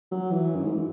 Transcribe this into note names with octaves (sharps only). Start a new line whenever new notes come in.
F#3
E3
F#2
G#2